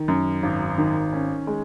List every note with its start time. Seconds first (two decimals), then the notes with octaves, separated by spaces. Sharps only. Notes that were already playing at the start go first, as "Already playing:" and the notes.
Already playing: D#3
0.08 F#2
0.43 G#1
0.78 D#3
1.13 C#4
1.47 G#3